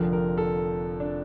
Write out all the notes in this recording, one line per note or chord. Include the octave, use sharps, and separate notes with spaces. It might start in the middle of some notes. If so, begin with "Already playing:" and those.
Already playing: F1 F2 D3 F3 A#4
A#4
A4
D4